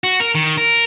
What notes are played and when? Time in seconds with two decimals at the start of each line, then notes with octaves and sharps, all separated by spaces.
0.04 F#4
0.20 A#4
0.35 D#3
0.57 A#4